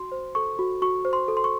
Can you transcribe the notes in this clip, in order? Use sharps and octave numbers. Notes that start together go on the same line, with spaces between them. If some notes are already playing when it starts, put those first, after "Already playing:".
Already playing: F#4 C6
C5
A4 C#6
F#4
F#4 C#6
C5
C6
A4
C6
C#6